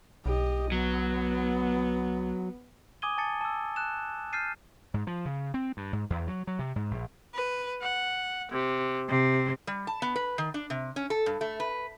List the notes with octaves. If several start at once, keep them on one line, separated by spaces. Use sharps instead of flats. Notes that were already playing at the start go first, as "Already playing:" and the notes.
B1 G4 D#5
F#3 B3
G#5 D6 D#6 G#6 D#7 G7
G#5 A5 A6 C#7
A5 E6
A5 F#6 E7
F6 G6 A6 C7 D#7
G#2
F3
C#3
C4
G2
G#2
E2
F#3
F#3
C3
G#2
A#1
B4
F#5
C3
C3
G3
A5
B3
B4
D#3
D4
C3
C#4
A4
G2
A3
B4